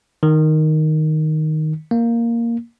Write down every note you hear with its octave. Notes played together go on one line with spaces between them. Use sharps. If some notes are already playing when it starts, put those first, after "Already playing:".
D#3
A#3